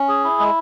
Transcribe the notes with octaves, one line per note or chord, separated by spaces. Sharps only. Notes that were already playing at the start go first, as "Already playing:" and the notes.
Already playing: C#4
G#4
E4
G#3